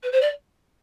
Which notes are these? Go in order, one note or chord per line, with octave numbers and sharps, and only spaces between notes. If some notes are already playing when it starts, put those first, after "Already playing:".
B4
C5
D5